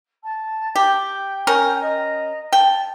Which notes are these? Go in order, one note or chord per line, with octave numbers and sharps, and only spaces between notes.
A5
G4 G5
C#4 A#4
D#5 A#5
G5 A5